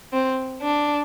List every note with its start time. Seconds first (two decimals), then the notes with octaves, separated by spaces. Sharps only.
0.13 C4
0.62 D4